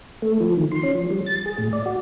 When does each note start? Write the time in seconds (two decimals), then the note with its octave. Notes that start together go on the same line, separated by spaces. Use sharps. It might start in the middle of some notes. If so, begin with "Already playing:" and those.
0.22 A3
0.40 F3
0.57 D#3
0.71 C6
0.83 C#4
0.95 F3
1.10 G3
1.26 A6
1.46 G#4
1.58 A2
1.73 D5
1.86 F#4